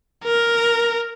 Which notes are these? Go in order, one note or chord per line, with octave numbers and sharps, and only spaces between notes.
A#4